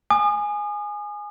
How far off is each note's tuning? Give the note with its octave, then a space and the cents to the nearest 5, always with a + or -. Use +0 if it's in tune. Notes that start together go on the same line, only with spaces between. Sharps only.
G#5 +0 D#6 -40